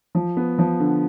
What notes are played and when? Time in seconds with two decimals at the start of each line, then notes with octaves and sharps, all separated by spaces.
0.15 F3
0.37 B3
0.59 F3
0.80 D3